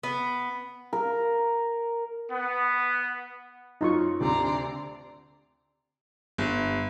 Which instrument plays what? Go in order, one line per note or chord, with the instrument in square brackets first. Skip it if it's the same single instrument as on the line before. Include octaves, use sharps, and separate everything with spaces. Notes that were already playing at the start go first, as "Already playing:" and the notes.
[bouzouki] B3
[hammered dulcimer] A#4
[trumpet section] B3
[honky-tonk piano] F#2 [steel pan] D#4 F4 C#6
[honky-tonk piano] D2 C3 [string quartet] D5 A#5 C6
[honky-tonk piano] G1